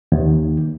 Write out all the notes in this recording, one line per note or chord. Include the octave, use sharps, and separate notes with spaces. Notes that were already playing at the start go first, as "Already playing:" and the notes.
D#2